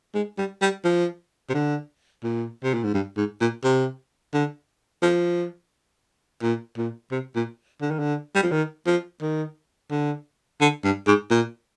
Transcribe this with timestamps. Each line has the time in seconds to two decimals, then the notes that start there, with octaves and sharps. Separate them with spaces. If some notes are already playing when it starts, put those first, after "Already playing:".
0.15 G#3
0.38 G3
0.62 G3
0.84 F3
1.49 C3
1.54 D3
2.23 A#2
2.64 C3
2.74 A#2
2.84 G#2
2.94 G2
3.17 G#2
3.41 A#2
3.64 C3
4.34 D3
5.02 F3
6.43 A#2
6.77 A#2
7.11 C3
7.36 A#2
7.81 D3
7.91 D#3
7.99 D3
8.35 G3
8.43 F3
8.51 D#3
8.86 F3
9.22 D#3
9.91 D3
10.61 D3
10.84 G2
11.07 G#2
11.31 A#2